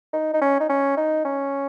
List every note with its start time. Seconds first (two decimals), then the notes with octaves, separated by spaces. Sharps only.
0.13 D#4
0.33 D#4
0.41 C#4
0.60 D#4
0.69 C#4
0.97 D#4
1.25 C#4